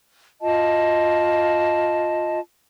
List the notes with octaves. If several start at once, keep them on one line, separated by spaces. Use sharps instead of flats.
F4 D#5 A5